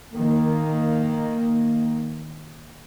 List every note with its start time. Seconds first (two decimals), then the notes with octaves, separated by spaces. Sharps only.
0.13 D#3 A#3